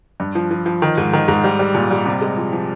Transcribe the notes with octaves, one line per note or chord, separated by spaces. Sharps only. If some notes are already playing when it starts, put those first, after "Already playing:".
G2
F3
F3
F3
D#3
G#2
D#3
G#2
G3
G3
A#2
G3
C3
G#3
F3
F3